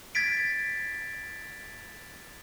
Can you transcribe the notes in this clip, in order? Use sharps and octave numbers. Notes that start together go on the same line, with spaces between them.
G#6 A6 B6 D7